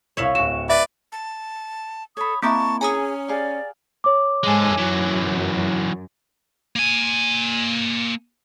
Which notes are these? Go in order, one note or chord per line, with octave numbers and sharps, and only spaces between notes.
C2 C#5 E5 F5 E7 F#7
D1 F#4 C#6 E7
B4 D5 E5
A5
A4 C#5 B5 D#6
A#3 C4 E4 A#4 A5 C#6 D6
C#4 G#4 G#5 A#5 D#6
G4 G#4 D5 F5
C#5 D6
G#2 G#3 A4 G#5
F#2 E3 F#3
A#3 G#5